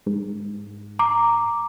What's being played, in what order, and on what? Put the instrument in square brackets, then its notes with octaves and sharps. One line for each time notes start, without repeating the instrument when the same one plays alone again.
[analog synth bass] G#2
[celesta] A#5 D6